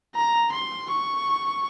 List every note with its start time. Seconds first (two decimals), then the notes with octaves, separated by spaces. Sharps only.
0.15 A#5
0.52 C6
0.90 C#6